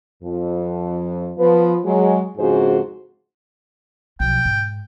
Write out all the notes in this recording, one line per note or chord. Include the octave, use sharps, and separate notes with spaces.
F2
F3 B3 B4
F#3 G#3
F2 G#2 C#3 F#4 G#4 C5
B1 F3 G5
G#2